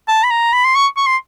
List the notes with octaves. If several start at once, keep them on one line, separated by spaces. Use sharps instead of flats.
A5
B5
A#5
B5
C6
C#6
C#6
C6